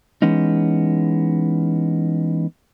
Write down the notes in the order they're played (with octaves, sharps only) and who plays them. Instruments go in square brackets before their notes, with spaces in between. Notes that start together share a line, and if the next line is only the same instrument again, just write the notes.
[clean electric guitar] E3 G#3 B3 C#4 D#4